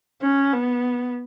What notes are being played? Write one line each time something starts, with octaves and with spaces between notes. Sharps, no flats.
C#4
B3